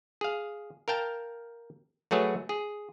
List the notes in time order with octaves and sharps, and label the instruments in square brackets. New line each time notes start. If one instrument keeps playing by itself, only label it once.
[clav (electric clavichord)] G#4 F5
A#4 F5 G5 A5
F#3 A3 F#4 G#4 B4 C#5
G#4